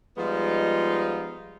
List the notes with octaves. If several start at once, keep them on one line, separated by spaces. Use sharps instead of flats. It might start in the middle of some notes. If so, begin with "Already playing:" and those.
F3 G3 G#3 B3 D#4 F4